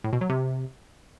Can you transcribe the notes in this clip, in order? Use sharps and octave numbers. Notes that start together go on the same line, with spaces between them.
A2
B2
F#3
C3